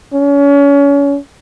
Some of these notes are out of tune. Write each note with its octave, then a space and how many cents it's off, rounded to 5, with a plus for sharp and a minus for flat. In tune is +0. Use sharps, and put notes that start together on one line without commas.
C#4 +30